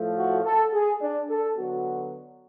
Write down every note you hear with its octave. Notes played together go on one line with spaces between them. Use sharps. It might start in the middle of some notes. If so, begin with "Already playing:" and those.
Already playing: A2 F3 A3
F#4
A4
G#4
D4
A4
D3 F#3 B3 F#4